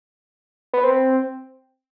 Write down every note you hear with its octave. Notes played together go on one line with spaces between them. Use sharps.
B3
C4